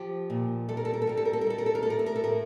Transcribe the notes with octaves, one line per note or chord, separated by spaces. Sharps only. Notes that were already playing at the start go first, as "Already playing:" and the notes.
Already playing: F3 G4
A#2
G3 A4
A#4
A4
A#4
A4
G3 A#4
A4
A#4
A4
A#4
G3 A4
A#4
A4
A#4
A2 A4
A#4
A4
A#4
A4
A2 A#4